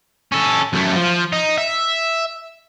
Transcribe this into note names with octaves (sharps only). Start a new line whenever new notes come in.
C#4 A4
F#2 A3
F3
D#4
E5